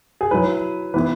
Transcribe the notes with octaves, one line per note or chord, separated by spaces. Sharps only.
G#4
F#3 E4 B4
E3 B3 E4 B4